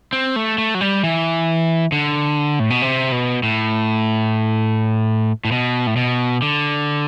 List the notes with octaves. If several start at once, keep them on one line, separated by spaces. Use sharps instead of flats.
C4
A3
A3
F#3
G3
E3
D3
A2
B2
C3
B2
A2
A2
B2
A2
B2
D3